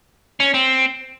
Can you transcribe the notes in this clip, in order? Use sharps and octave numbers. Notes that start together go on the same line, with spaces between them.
C#4
C4